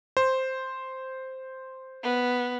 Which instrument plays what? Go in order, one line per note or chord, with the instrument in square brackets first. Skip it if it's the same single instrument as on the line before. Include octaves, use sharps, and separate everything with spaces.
[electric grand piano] C5
[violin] B3